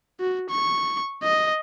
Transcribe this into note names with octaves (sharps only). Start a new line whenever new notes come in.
F#4
C#6
D#5